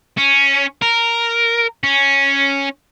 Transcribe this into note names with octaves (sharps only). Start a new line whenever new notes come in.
C#4
A#4
C#4